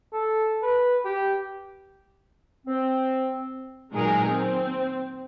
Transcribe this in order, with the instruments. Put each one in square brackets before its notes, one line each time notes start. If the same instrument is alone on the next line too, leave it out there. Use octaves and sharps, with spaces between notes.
[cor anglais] A4
B4
G4
[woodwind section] C4
[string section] A#2 D#3 F#3 G#3 G#4 A#4
C4